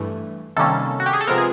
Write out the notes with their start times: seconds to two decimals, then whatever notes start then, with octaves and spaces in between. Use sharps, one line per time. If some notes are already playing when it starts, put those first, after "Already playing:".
Already playing: G2 E3 A3
0.56 C3 D#3 G3 A#3 C#4 A4
1.00 F#4
1.06 G4
1.13 G#4
1.21 A4
1.27 C3 F3 G#3 B3 A#4
1.38 G#4